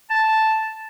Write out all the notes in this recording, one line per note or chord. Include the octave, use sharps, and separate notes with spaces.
A5